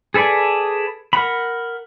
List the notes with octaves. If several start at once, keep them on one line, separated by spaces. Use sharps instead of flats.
G#4 A4 B4 D5 G#5
A#4 F#5 B5